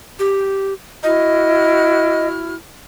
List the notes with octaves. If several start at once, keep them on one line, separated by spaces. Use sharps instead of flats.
G4
E4 F#4 D#5 F6